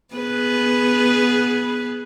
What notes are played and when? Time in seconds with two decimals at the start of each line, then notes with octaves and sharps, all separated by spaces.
0.14 B3 G#4 B4